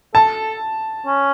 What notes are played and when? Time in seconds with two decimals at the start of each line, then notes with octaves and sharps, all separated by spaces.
0.14 A4 A5
1.07 C#4